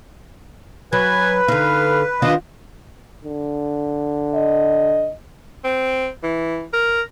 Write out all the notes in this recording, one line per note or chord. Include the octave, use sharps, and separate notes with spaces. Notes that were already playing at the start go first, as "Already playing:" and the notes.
F#3 B4 G#5
D3 D#4 F5
D#3 D4 F4 D#5
D3
D#5
C4
E3
A#4